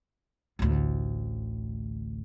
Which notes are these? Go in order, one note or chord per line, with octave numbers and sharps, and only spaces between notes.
A1 D2